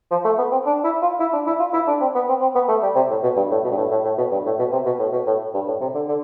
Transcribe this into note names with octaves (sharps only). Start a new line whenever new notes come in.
F3
A3
B3
C4
D4
E4
F4
E4
D4
E4
F4
E4
D4
C4
B3
C4
C4
B3
A3
G3
C3
A2
B2
G2
A2
B2
G2
A2
A2
A2
B2
G2
A2
B2
C3
B2
A2
B2
A2
G2
A2
C3
D3
D3